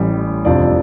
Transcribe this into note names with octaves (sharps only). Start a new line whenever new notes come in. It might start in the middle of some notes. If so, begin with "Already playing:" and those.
Already playing: A1 A2 G3
F1 F2 C3 F3 D4 D5